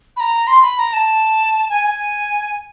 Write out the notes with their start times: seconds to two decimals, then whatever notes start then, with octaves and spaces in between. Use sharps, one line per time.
0.17 B5
0.20 A#5
0.47 C6
0.62 B5
0.78 A#5
0.93 A5
1.70 G#5
1.85 G#5